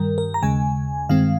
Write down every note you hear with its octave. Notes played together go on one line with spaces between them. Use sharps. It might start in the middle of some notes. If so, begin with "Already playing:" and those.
Already playing: G2 D#3 G3 A#4
A#4
A#5
D#2 C#3 G#3 G#5
G2 D#3 G#3 C4 F5